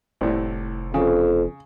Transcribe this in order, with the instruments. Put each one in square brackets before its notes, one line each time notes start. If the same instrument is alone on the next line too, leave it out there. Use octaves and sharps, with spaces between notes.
[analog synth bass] F1 [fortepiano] C2 A2
[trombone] F2 [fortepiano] C#3